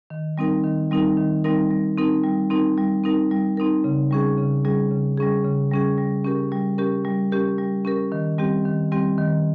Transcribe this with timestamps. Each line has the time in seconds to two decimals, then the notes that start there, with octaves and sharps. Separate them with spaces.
0.10 D#3
0.38 G3 C4 D#4 A#4
0.64 D#3
0.91 G3 C4 D#4 A#4
1.17 D#3
1.44 G3 C4 D#4 A#4
1.71 G3
1.98 C4 D#4 A#4
2.24 G3
2.50 C4 D#4 A#4
2.78 G3
3.04 C4 D#4 A#4
3.31 G3
3.57 C4 D#4 A#4
3.84 C#3
4.11 G3 C#4 G#4
4.38 C#3
4.65 G3 C#4 G#4
4.91 C#3
5.18 G3 C#4 G#4
5.44 C#3
5.72 G3 C#4 G#4
5.98 G3
6.24 C#4 G4 A#4
6.52 G3
6.78 C#4 G4 A#4
7.05 G3
7.32 C#4 G4 A#4
7.58 G3
7.85 C#4 G4 A#4
8.12 D#3
8.38 G3 C4 G4
8.65 D#3
8.92 G3 C4 G4
9.18 D#3